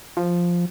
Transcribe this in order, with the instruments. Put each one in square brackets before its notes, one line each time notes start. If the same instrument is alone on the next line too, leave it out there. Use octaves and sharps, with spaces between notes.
[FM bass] F3